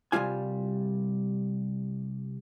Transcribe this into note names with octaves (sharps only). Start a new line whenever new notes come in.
C2 C#3 G3 F4 G#5